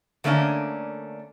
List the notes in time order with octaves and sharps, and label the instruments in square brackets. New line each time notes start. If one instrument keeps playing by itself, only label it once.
[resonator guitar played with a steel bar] D3 A3 A#3 C#4 D4